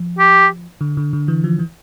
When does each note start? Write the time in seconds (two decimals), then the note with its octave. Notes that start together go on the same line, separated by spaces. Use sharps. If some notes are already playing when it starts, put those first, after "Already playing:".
Already playing: F3
0.19 G4
0.81 D3
0.97 D3
1.13 D3
1.28 E3
1.44 F3
1.59 E3